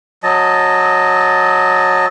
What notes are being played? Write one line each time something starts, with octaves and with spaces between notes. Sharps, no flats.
F#3 D#5 A5